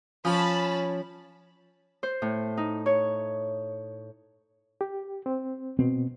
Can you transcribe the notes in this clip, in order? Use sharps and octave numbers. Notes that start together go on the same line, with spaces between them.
F3 C#4 A5 B5
C5
A2
D#4
C#5
G4
C4
B2 C4